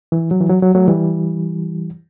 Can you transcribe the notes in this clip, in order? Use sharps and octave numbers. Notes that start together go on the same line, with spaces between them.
E3
F#3
E3
F#3
F#3
F#3 A3
E3 G3